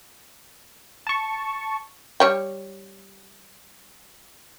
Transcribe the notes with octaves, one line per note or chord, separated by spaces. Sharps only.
A5 C#6
G3 C#5 G5